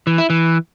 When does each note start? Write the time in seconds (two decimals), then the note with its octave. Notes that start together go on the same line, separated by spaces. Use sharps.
0.07 E3
0.18 E4
0.30 E3